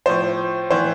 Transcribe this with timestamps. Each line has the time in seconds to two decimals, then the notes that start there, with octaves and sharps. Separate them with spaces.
0.06 A2 F3 C5
0.70 A2 E3 C5